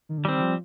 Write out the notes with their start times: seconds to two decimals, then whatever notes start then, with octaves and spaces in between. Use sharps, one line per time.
0.09 D#3
0.18 D3
0.25 D#3 G3 C4
0.38 D#3
0.41 F3